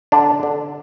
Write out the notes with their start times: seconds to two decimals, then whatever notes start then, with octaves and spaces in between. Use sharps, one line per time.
0.12 D3 D4
0.43 D3